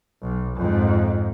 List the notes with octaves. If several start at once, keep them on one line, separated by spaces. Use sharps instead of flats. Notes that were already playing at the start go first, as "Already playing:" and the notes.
B1
F2 G#2